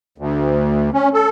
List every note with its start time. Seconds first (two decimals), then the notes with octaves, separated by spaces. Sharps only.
0.18 D2
0.93 C#4
1.14 A4